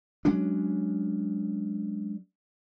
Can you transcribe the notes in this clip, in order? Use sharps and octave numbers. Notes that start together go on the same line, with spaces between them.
F#3 G#3 C#4 D4